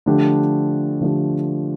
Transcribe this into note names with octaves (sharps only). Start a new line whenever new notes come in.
D3 F3 A3 D4 G4
D3 F3 A3 D4 G4